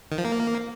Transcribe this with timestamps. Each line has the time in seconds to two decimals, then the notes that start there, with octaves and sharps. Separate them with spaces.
0.12 D#3
0.18 F3
0.25 A#3